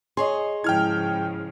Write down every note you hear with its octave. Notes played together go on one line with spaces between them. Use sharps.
G#4 C#5 D#5 C6
G#2 C#3 F3 E4 G5 F6 G#6